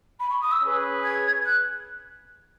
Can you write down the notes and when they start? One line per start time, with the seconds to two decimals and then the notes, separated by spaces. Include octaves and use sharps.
0.19 B5
0.30 C#6
0.41 D#6
0.51 E6
0.61 C#4 G#4 B4
1.03 G#6
1.45 F#6